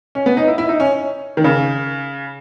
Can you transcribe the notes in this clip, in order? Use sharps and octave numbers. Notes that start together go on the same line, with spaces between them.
C#4
B3
D#4
E4
E4
D#4
C#4
D#3
C#3